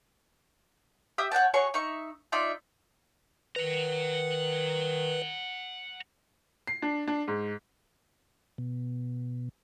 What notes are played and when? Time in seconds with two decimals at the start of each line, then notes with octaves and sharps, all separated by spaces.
1.18 G4 E5 D#6 E6
1.31 C#5 F#5 G5 A5
1.54 F#4 G#4 C#5 C#6
1.74 D#4 E5 C#6
2.32 D#4 F4 D5 E5
3.56 D#3 B4 F#5 A#5
6.67 C7
6.82 D4
7.08 D4
7.28 G#2
8.58 B2